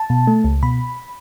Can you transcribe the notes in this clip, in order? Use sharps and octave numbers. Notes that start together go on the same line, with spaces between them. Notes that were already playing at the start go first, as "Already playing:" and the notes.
Already playing: A5
B2
A3
C#2
B2 B5